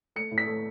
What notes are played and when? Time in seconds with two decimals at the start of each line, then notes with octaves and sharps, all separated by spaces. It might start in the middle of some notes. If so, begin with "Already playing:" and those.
0.16 A3 C#7
0.31 A2
0.38 B6
0.47 A3